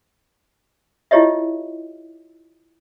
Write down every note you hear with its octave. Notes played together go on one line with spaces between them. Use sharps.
E4 F4 G4 C#5 D#5 E5